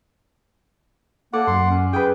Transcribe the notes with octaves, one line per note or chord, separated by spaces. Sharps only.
A#3 A4 D5 F#5
F#2 C6
C#4
G#4 B4 G5